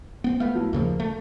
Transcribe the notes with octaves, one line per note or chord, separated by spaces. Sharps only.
B3 C4
A3 B3 F5
A2 F#3
D#2 C#3 F3 A#3
A3